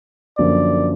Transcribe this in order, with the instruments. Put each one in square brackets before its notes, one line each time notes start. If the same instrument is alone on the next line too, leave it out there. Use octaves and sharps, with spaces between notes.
[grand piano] F#2 D3 F3 A#3 [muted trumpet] D5